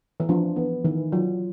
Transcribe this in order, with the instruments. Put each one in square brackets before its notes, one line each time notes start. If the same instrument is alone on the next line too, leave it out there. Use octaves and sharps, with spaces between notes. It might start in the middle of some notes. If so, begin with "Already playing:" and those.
[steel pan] E3
[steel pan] F3 [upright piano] D4
[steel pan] E3 [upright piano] B3
[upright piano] D#3 [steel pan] E3
[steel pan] F#3 [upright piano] F4